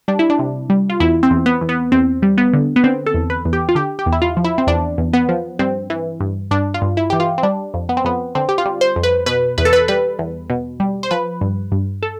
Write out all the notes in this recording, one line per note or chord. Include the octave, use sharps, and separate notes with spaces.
G3 D4
E4
D4
C3
G3
F4
E2 E4
C4
E2
B3
E2
B3
E2 C4
G3
B3
D3
B3
D3 C4
A4
E2
B4
E2
G4
F4
D3 G4
G4
E2
E4
F4
F3
E4
C4
E2 D4
E2
B3
F3
G2 C4
E3
G2
G2 D4
F4
G2
E4
E3 G4
F4
C4
G3 D4
F2
B3
C4
F2 B3
D3 C4
G4
F4
G3
C5
F2
B4
B2 B4
E2 B4
A4
B4
G3 B4
E2
B2
G3
C5
F3 B4
G2
G2
A4